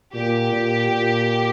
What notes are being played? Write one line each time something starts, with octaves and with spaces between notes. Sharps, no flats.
A#2 G4
A#2
A#2